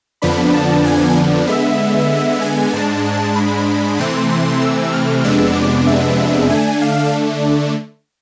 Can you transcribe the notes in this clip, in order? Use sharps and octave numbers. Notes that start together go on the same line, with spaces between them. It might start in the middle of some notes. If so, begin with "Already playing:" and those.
F2 D3 F3 B3 D4 B5
A5
G#5
D3 G#3 B3 E5
G#5
G#2 G#3 D4 A5
A5
B5
C3 E3 A3 C4 C6
C6
E6
F6
F2 C3 G#3 B3 D4 E6
D6
E5
D3 A3 D4 G#5
F5